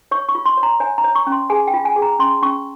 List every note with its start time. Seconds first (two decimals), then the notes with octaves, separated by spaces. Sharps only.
0.11 C#5 C#6
0.29 C#6
0.35 F4
0.46 C6
0.57 C#5
0.63 A#5
0.80 C#5 G#5
0.98 A#5
1.04 C#5
1.15 C#6
1.27 C#4
1.32 C6
1.50 G#4 G#5
1.67 G5
1.74 F4
1.85 G#5
1.96 G#4
2.02 A#5
2.19 C#4 C6
2.42 C#4 C#6